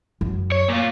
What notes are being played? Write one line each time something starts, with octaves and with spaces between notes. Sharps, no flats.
F#2
C#5
A#2 F4